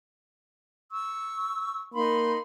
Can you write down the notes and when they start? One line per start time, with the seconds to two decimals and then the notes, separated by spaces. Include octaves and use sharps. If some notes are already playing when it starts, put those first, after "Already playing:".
0.92 C#6 E6
1.94 A#3 D#4 B5 C6